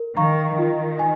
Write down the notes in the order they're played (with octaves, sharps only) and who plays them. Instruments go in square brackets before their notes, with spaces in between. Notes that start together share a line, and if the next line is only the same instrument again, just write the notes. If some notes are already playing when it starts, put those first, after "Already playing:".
Already playing: [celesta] A#4
[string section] D#3 [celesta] F5 A#5 C#6
[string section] D#3 [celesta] F4
[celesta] G#5